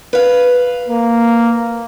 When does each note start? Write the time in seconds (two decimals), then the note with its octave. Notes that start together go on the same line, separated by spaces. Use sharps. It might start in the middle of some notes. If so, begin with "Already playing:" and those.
0.13 B4 F5
0.88 A#3